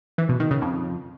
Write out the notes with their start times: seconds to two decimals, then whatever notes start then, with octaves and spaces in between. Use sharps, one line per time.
0.18 E3
0.29 B2
0.40 D#3
0.51 C#3
0.62 F2